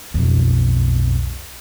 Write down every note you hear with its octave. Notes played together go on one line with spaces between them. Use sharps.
B1 F2